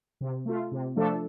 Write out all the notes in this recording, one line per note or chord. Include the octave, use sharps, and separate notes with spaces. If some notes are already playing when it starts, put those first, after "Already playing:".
C3
A3 F4
C3
F3 A3 D4 A4